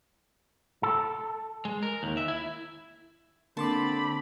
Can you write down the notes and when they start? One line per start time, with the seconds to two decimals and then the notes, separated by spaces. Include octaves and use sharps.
0.83 A4
1.65 G#3
1.83 A#4
2.03 D#2
2.17 E5
2.28 E4
3.57 D3 A#3 C4 A5 B5 C6 D6